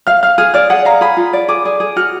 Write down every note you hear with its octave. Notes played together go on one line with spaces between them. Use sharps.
F5 F6
F5 F6
G#4 F6
D5 F6
G#4 F#5
F5 A#5
G#4 B5
F4
D5
G#4 D6
G#4
G#4
F#4 F6